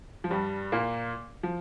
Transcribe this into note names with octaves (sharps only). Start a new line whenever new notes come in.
F3
G2 G3
A#2 A#3
F3